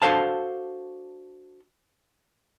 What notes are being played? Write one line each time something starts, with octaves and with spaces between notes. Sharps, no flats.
D4 F#4 A4 C5 F5 A5